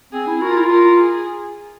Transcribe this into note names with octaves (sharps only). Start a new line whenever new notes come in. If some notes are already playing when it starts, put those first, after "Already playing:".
C4 G#4
E4
F#4 A#4
F4
E4
F4
A#4
G#4